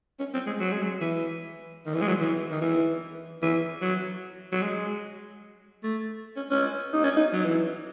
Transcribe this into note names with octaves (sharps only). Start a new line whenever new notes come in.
C#4
C4
G#3
F#3
G#3
F#3
E3
D#3
E3
G#3
F#3
E3
D#3
E3
E3
F#3
F#3
G#3
A3
C#4
C#4
D#4
C#4
D#4
F#3
E3